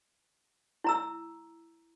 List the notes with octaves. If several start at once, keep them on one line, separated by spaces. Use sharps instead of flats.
E4 A#5 E6